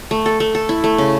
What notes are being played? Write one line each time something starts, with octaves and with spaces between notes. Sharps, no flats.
A3
A4
A3
A4
E4
A3
C#3